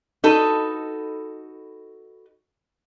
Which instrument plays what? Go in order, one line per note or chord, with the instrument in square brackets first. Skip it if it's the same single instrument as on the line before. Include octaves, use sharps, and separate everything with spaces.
[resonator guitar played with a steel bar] D#4 F#4 A4 B4